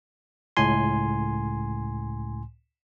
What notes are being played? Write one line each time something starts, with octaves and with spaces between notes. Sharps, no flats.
C#2 A2 G#5 C6